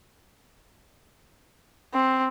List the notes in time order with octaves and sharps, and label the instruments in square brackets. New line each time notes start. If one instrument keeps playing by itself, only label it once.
[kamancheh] C4